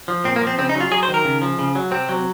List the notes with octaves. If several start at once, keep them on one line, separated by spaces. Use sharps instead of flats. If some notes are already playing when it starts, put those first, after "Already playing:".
F3
A#2 C4
A#3
F3
C4
C#3 C4
D#4
F#3
F4
F#3 G#4
C5
D#3
A#4
C#3
F3
C#3
F#3
C3 C4
F#3